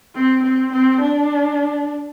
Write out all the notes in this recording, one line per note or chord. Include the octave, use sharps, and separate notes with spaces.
C4
C4
C4
D4